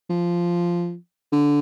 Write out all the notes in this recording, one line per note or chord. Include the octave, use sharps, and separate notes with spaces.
F3
D3